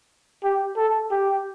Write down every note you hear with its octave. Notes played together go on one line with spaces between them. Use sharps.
G4
A4
G4